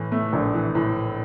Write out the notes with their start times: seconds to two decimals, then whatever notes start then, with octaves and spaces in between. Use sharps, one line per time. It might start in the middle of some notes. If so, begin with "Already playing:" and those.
Already playing: A2 E3
0.12 A3
0.33 A#1
0.54 E3
0.75 A2